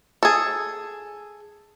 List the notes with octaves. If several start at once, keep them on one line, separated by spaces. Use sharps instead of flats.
G#4 A4